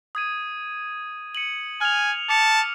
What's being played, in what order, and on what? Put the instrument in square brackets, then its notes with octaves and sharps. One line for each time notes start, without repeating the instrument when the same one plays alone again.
[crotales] D#6 G#6 D#7
C#7 D#7 F#7
[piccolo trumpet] G#5 [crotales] F6 F7
[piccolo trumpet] A5 [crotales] D6 C#7